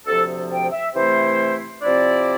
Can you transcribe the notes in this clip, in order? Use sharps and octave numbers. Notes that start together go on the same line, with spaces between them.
D2 C3 F3 A4
G5
E5
C3 E3 A3 E4 C5
C3 F3 C4 E4 D5